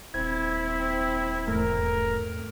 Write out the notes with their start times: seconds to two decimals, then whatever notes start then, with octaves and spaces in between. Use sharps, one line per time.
0.14 D#1 C4 E4 G#6
1.48 E2 G#2 A3 A#4